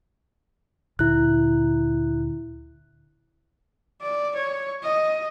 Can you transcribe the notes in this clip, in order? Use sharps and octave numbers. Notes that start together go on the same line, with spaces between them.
D2 A#2 D3 E4 F#6
D5
C#5
D#5